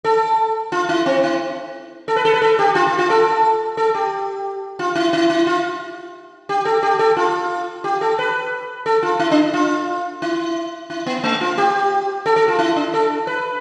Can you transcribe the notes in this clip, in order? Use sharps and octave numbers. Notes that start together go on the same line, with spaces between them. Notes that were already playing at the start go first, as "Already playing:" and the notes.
A4
F4
E4
C4
E4
A4
B4
A4
B4
A4
G4
F4
F4
F4
A4
A4
G4
F4
E4
E4
E4
F4
G4
A4
G4
A4
F4
G4
A4
B4
A4
F4
E4
D4
F4
E4
E4
B3
A3
F4
G4
A4
A4
F4
E4
D4
A4
B4